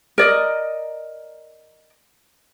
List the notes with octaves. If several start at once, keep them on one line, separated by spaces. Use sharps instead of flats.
A#4 D5 D#5